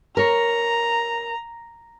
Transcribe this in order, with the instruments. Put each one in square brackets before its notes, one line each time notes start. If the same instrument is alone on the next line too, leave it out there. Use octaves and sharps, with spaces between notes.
[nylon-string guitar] A#4 C#5 [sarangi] A#5